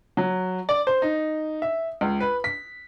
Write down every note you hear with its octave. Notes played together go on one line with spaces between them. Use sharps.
F#3
D5
C5
D#4
E5
C#2
B4
B6